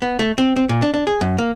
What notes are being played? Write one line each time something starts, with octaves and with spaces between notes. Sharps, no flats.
B3
A3
C4
C4
A#2
D4
D4
G#4
F#2
A#3